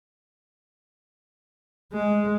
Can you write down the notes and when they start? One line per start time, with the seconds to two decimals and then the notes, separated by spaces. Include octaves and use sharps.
1.93 G#3